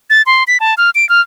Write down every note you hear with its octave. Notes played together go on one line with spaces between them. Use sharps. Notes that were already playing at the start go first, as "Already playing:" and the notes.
A6
C6
B6
A5
F6
D7
F6